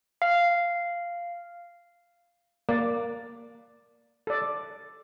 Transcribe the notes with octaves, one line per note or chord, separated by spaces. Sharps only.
F5
A#3 D5
A4 D5